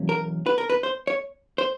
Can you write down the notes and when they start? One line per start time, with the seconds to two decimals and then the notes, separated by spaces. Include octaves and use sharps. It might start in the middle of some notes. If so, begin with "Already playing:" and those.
Already playing: E2 B2 F#3 A#3 C#4
0.09 A#4
0.46 B4
0.58 A#4
0.70 B4
0.83 C5
1.07 C#5
1.58 C5